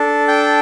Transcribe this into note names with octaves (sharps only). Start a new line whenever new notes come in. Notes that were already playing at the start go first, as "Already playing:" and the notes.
Already playing: D4 A4
G5